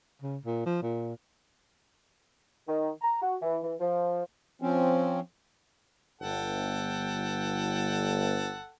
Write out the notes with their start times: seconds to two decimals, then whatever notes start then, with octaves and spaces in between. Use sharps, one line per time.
0.22 C#3
0.46 A#2
0.66 F3
0.83 A#2
2.67 D#3
3.02 A#5
3.21 F#4
3.42 E3
3.63 E3
3.80 F3
4.62 F3 C4 C#4
6.21 G1 A4 F#5 G5